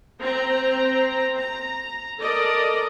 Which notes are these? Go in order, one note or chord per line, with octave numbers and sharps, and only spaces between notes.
C4 A#5
A#5
A4 A#4 D5 D#5